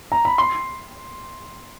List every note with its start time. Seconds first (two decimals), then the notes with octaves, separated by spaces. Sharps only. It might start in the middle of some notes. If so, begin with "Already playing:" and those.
0.12 A#5
0.25 B5
0.38 C6